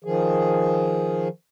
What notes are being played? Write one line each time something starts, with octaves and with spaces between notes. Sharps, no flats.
D#3 F3 G#4